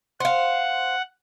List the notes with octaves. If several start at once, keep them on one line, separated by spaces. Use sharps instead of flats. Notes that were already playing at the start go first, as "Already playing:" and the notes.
C5 F5 F#5